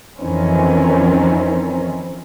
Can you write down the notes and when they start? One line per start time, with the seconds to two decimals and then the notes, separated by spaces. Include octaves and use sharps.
0.20 F2 D#3 E3 C4 C#4